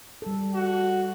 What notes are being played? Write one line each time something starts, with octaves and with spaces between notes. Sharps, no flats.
G3 A4
F#4